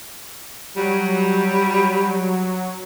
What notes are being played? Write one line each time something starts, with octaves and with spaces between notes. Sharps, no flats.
F#3 G3